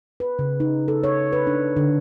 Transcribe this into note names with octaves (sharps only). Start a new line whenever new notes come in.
B4
C#3
D#4
A4
C#5
B4
D4
D3